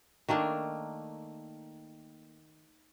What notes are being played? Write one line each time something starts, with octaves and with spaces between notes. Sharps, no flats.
D#3 A3 A#3 D4